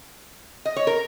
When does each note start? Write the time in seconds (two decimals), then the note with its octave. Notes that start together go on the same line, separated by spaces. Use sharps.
0.65 D#5
0.76 C#5
0.87 A#4